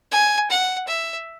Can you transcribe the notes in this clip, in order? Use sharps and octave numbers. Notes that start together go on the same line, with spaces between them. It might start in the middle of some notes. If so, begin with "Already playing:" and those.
G#5
F#5
E5